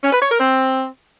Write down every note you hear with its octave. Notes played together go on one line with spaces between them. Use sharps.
C#4
B4
C#5
A#4
C4